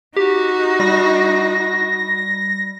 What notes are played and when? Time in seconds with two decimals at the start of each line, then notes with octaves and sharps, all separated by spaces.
0.17 D#4 F#4 G4
0.80 G3 A#6